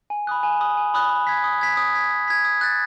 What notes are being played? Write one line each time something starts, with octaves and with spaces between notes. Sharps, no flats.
G#5
B5 D#6 F#6
G#5
B5 D#6 F#6
G#5
B5 D#6 F#6
D#6
G#6 B6
D#6
G#6 B6
D#6
G#6 B6
D#6
G#6 B6
D#6
F#6 A6